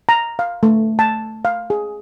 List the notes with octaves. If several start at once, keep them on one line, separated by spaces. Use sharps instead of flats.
A#5
F5
A3
A5
F5
G#4